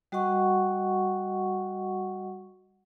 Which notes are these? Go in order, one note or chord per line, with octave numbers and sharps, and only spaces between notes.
G3 F#4 D#5 F#5 C#6